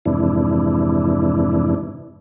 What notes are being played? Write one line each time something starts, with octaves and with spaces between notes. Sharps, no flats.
F2 G#2 C3 E3 D4 E4